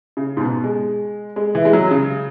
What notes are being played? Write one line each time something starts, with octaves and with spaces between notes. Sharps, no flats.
C#3
G#2
B2
G#3
G#3
E3
G#3
F#3
C#3